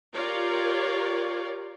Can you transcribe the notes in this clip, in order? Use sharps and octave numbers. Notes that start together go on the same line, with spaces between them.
F4 G4 A#4 C#5 D5